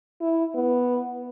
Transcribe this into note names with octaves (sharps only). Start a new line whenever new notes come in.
E4
B3